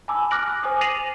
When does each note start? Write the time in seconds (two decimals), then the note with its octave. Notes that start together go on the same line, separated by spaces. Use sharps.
0.08 G#5 A5 B5 D6 E6
0.31 D6 F6 F#6 A#6 D7 F#7
0.63 C5 G#5 D6 D#6
0.81 A6 A#6 C7 D#7 F7 F#7